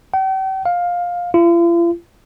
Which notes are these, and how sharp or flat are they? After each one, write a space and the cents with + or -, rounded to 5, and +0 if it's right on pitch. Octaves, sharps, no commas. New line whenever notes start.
G5 -40
F5 +15
F4 -45